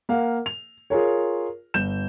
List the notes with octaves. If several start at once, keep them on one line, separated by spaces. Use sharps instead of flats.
A#3 F5 F#5
F7
F4 G#4 A#4 C#5
G1 G6 E7